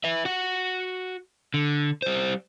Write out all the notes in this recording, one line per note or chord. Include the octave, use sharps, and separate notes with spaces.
B4 E5
F#4 F#5
D3
G3 C5